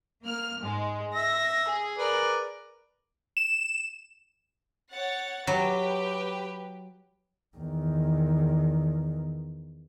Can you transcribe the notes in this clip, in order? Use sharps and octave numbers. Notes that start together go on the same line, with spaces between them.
A#3 F6
G#2 G#3
E5 A#6
G#4
A#4 B4 D5
E7
C#5 F#5 A6
F#3 G4 B4
E2 D#3